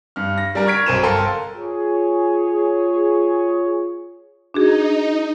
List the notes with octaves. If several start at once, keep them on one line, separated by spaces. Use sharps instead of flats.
G2 F6
A#6
G3 D4 A#4
C#6 F6 G#6 B6 D7
B1 C4 A#4 C5 D#7 E7
G1 A4 A#4 F5 G5 C6
F4 G#4 C#5
D4 D#4 F#4 G#4